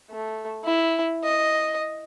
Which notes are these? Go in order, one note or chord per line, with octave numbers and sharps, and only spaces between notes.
A3
E4
D#5